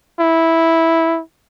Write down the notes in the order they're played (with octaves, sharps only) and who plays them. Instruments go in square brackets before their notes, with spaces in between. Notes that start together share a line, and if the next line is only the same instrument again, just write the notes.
[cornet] E4